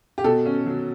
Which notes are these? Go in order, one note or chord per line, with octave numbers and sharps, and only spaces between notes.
G4
B2 A4
C#4
F#3